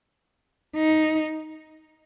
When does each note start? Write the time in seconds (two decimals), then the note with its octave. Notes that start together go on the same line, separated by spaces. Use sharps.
0.76 D#4